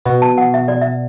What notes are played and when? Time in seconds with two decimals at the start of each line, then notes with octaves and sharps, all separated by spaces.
0.05 B2 B3 F#4
0.22 A5
0.38 F#5
0.54 E5
0.68 D5
0.81 E5